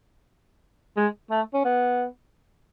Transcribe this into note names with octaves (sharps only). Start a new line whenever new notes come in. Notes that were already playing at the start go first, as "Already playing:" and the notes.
G#3
A3
C#4
B3